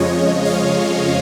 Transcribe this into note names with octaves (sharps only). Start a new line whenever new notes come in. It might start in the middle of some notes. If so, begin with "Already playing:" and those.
Already playing: F2 C#3 F3 G#3 C#5 D#5
D#5 F5